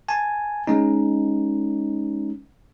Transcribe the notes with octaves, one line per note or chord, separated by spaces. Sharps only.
G#5 A5
G#3 C#4 D#4